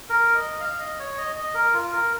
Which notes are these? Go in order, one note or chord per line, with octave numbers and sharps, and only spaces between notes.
A#4
D#5
F5
D#5
C#5
D#5
D#5
A#4
F4
A#4